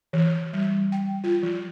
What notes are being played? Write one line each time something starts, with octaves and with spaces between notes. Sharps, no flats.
E3
G3
G5
F4
F3